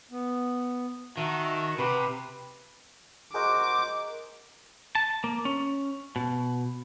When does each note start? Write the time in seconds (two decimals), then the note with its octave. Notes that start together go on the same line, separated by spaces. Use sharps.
0.11 B3
1.17 D#3 F#4 E5 A5
1.79 C3 G4 B4
3.34 F#4 G#4 A#4 C5 D#5 D6
4.95 A5
5.24 A#3
5.45 C#4
6.16 B2